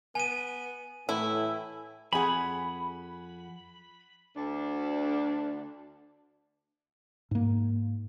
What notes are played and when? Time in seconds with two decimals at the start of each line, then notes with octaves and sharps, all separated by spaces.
0.15 B3 G#5 D#7
1.09 A2 E3 E4
2.13 F2 G#4 F#5 G#5 B5
4.36 D2 D4
7.31 G#2 A#3